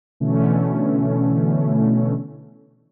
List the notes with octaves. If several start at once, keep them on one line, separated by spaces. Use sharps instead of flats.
B2 D3 E3 A3 C#4